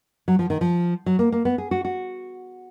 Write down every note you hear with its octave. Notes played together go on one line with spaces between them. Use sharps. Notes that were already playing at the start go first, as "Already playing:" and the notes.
F#3
F3
D#3
F3
F#3
A#3
A#3
B3
G#4
F#4
F#4